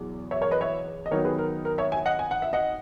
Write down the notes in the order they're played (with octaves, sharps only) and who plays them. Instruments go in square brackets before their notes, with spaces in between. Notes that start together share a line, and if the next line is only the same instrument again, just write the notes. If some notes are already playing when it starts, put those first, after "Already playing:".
Already playing: [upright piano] E2 B2 F#3
C#5 E5
A#4 C#5
B4 D#5
C#5 E5
D#5
D#3 F#3 B3 D#4 A#4 C#5
G#4 B4
A#4
A#4
C#5 E5
E5 G#5
D#5 F#5
G#5
F#5
E5
D#5 F#5